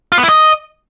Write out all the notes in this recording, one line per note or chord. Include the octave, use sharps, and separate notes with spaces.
F4
B3
E4
D#5